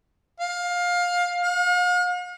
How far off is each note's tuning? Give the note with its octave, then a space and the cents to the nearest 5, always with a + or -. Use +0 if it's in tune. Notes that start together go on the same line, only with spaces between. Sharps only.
F5 +20
F5 +45